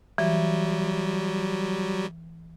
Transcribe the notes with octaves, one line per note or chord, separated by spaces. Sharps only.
E3 F#3 G3